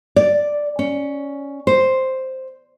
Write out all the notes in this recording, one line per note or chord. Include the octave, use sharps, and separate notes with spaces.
D5
C#4
C5